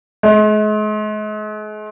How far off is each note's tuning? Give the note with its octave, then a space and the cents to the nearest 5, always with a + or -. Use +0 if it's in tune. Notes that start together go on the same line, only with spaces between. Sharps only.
G#3 +40